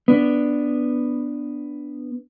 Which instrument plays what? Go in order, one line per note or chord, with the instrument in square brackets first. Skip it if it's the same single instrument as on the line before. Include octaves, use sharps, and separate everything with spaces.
[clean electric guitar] B3 D4